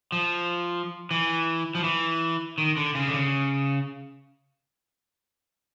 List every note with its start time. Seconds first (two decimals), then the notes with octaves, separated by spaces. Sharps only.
0.12 F3
1.11 E3
1.75 F3
1.84 E3
2.58 D#3
2.77 D3
2.95 C#3
3.07 D3
3.13 C#3